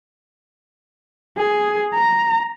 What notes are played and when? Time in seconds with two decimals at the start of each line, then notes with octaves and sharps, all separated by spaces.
1.37 G#4
1.94 A#5